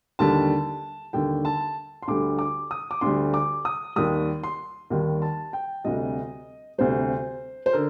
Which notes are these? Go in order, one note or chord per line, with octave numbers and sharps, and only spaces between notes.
D#2 D3 G3 A5
D#2 D3 G3 G5
A5
C6
D2 D3 G3 D6
D6
D#6
D6
D2 D3 G3 C6
D6
D#6
D#2 D#3 G3 D#6
C6
D#2 D#3 G3
A5
G5
D2 C3 G3 D#5
D2 C3 G3 C5
C5
D3 A#4